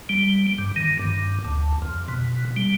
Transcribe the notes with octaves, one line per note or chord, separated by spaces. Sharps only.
G3
G2
D#3
G2
D2
F2
B2
G3